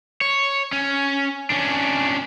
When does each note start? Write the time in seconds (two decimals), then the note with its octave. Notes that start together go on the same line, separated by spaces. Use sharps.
0.21 C#5
0.73 C#4
1.50 C#4 D4